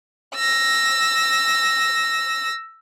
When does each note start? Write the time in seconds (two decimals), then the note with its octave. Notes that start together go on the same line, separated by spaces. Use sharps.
0.35 E6 A#6